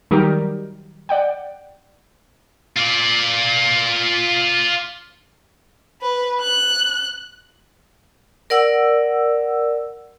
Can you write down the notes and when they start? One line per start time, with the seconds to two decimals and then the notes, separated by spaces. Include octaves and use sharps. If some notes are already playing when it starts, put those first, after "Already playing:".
0.11 D#3 F#3 G3 D#4 G4 A#4
1.09 D5 F#5 G5
2.76 F4 D5
6.02 B4
6.42 F#6
8.50 A#4 D5 F#5 E6